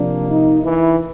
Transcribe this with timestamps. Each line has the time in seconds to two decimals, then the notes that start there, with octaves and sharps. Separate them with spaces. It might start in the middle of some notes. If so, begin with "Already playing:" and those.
Already playing: C3 F3 A#3 D4
0.29 D#4
0.64 E3 E4